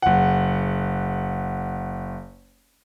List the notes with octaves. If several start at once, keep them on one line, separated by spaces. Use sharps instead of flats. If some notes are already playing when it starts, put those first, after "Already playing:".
F#1 F#5